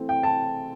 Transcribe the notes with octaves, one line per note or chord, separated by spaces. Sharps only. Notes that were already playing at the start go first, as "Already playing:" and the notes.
Already playing: E3 A3 C4
G5
A5